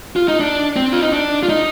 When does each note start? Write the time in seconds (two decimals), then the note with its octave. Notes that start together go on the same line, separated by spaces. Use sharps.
0.16 F4
0.28 D#4
0.40 D4
0.76 C4
0.93 F4
1.02 D#4
1.13 D4
1.43 F4
1.49 D#4